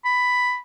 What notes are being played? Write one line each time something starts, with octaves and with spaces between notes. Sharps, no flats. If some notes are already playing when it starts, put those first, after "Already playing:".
B5